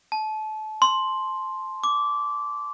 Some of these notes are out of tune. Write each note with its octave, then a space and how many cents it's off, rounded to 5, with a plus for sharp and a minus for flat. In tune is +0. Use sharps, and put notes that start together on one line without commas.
A5 -30
C6 +5
D6 -15